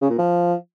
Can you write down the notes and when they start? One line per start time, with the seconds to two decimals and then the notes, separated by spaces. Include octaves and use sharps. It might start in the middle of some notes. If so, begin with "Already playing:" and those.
0.01 C#3
0.10 A#2
0.18 F3